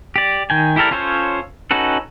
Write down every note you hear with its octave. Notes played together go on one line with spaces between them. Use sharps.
G4 D5
D#3 G5 G#5
E4 G4 A4 A#4 D5
C#4 F4 A4 C5 C#5
C#4 D#4 F#4 A4 B4